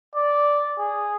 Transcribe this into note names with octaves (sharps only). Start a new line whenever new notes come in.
D5
G#4